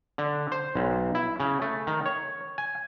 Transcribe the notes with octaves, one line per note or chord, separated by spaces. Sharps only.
D3
C5
B1
E4
C#3
A3
D#3
C#5
G#5